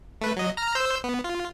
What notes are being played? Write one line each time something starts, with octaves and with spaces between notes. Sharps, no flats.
A3 B4
F#3 D#5
A#5 F6
C5 E6 G6
B3
F4